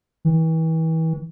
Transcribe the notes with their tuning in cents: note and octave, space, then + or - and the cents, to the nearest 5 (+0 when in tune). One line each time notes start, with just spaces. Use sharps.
E3 -35